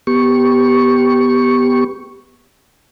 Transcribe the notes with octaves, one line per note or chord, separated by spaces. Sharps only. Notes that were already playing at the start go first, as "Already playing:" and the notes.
B3 G4 C#6